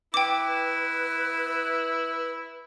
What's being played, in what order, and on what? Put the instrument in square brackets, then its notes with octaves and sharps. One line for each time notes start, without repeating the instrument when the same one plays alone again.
[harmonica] E4 [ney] B4 [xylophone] G5 D6